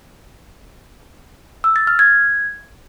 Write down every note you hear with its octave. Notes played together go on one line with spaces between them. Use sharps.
E6
A6
F6
G#6